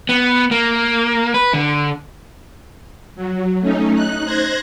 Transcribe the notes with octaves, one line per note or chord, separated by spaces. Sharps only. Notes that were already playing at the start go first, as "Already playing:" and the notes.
B3
A#3
B4
D3
F#3
A3 C#4 D#4
D#4 F#6
C5 F#6 G#6 A#6